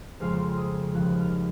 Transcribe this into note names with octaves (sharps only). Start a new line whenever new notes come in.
F2 C#3 G#3 C4 F6
D#6
D#2 C#3 F3 F#6
F6